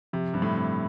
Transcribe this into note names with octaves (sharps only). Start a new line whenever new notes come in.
C3 F3
G2 C4
A2
C4